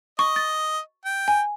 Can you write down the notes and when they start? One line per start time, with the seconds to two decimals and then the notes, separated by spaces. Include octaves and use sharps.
0.19 D#5 C#6
0.36 A6
1.05 G5
1.28 G#5